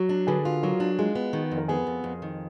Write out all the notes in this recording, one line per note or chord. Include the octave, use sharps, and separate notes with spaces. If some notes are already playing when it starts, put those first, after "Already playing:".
Already playing: F#3 F#4
D4
D3 G#4 B4
F4
F#3 F#4 A#4
D4
G#3 F4 G#4
B3
D#3
F2
A#4
B3 G#4 B4
F2
F2
D#3